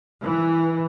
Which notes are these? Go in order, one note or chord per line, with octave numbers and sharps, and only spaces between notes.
E3